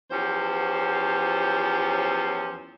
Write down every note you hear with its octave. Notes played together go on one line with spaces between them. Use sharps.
E2 F3 F#3 C#4 G4 C5